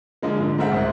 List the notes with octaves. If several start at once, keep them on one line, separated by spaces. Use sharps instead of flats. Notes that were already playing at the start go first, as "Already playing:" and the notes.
D3 F3 G#3 A#3
G#2 D3
G#3 A3 C4 A#4 E5 F#5
C2 G#2 C5